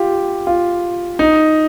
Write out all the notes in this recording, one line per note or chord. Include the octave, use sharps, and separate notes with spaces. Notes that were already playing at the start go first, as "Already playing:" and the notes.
Already playing: F4 G4
F4
D#4